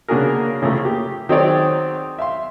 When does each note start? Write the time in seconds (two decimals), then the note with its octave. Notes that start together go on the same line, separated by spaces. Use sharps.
0.08 C#3 A#3 D4 F#4 G#4 A#4
0.62 A2 C#3 E3 F3 A3 A#3
0.85 G4
1.29 D#3 F#3 C4 G#4 C#5 D5
2.19 E5 F5 C6